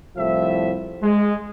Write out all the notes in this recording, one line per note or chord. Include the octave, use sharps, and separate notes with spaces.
C2 A2 F3 E5
G#3